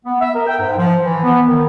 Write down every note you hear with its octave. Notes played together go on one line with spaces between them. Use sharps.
B3
E5
A#4
G5
G#2
F3
E3
B3
D#3